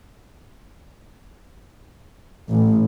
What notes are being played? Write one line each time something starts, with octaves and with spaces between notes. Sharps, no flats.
A1